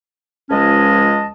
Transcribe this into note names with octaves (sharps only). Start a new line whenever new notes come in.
C#2 F3 G#3 C#4 D#5 A5